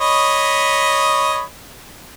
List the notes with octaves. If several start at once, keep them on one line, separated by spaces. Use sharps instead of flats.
C#5 D#5 B5